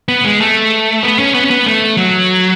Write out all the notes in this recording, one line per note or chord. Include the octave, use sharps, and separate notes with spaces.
B3
G#3
A3
B3
C#4
B3
C#4
B3
A3
F#3